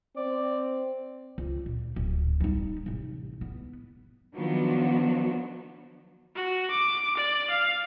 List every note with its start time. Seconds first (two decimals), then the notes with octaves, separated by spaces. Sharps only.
0.17 C4 D5
1.38 C#2
1.66 A#2
1.96 D1
2.40 G3 D#4
2.86 A1 C3
3.41 B3
4.34 D#3 F3 F#3 B3 D4 F#4
6.36 F#4
6.71 D6
7.17 D5
7.50 F5